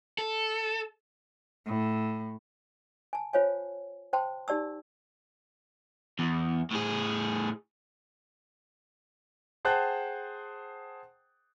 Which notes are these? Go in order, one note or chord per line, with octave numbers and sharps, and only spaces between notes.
A4
A2
G#5 A5
F4 C5 C#5 F5 G#5
C5 G5 A5 C6
D#4 G4 D5 A5 E6
E2
A2 G#4
G#4 C5 F#5 G5 A5 F#6